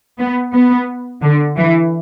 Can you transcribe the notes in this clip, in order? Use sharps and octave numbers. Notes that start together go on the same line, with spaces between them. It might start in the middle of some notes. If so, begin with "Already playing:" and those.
B3
B3
D3
E3